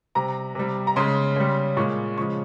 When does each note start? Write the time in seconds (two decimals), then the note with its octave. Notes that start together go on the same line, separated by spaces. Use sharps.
0.15 C3 G3 A#5
0.55 C3 G3
0.87 A#5
0.96 C#3 G#3 C6
1.36 C#3 G3
1.77 A#2 G#3 C#6
2.17 C#3 F3 G#3 C#6